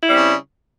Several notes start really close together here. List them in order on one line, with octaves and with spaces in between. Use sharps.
E4 G3 C4 C#3